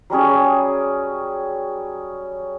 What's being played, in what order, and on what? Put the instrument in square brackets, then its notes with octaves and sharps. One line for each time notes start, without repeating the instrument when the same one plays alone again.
[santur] F#3 G3 C#4 G#4